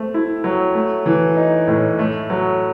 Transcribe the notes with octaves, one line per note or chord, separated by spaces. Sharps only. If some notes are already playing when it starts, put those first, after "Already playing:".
Already playing: A3 C4
E4
F#3
A3
E3
D#4
A2
A3
F#3